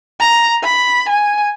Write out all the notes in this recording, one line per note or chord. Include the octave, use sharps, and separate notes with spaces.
A#5
B5
G#5